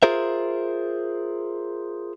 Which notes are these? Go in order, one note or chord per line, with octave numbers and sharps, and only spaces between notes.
F4 G#4 A#4 C5 E5